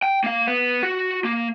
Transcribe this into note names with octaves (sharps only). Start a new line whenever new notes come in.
G5
A#3 F5
B3
F#4
A#3